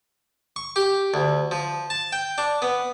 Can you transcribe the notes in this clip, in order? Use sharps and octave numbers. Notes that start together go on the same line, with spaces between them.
C#6
G4
D2
F3
A5
G5
D4
B3